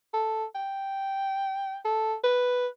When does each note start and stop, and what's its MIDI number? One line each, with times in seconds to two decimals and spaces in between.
0.14 0.45 69
0.55 1.77 79
1.85 2.15 69
2.24 2.67 71